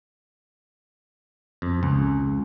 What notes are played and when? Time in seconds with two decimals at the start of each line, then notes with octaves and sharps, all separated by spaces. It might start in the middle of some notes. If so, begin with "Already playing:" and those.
1.62 F2
1.83 C#2